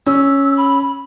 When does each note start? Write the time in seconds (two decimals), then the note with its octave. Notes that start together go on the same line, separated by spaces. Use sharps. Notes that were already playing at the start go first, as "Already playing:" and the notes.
0.06 C#4 E6
0.57 B5